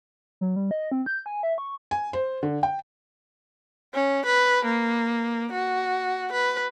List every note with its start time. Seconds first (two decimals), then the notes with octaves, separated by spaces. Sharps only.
0.41 F#3
0.56 G3
0.71 D#5
0.92 C4
1.06 G6
1.26 G#5
1.43 E5
1.58 C#6
1.91 G#5
2.13 C5
2.43 D3
2.63 G5
3.94 C#4
4.26 B4
4.65 A#3
5.52 F#4
6.33 B4